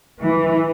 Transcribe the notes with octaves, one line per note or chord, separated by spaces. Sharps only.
E3